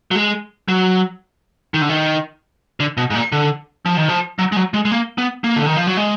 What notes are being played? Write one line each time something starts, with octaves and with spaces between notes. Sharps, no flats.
F#3
G#3
F#3
D#3
D3
D#3
D3
B2
G#2
A#2
D3
F3
D#3
F3
F#3
G#3
F#3
G#3
G#3
A#3
B3
A#3
D3
D#3
F3
F#3
G#3